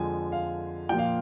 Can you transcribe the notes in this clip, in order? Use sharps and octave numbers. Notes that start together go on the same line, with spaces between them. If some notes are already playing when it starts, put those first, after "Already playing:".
Already playing: F2 D3 F3 G#3 G#5
F5
A#2 F3 A#3 G5
F5